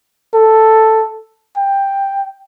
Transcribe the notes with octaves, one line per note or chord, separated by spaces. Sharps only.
A4
G5